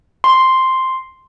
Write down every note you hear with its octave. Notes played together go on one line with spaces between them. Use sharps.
C6